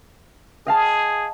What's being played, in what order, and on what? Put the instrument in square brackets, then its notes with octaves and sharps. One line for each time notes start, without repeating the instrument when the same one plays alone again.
[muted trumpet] G#4 [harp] D#5 F5 A5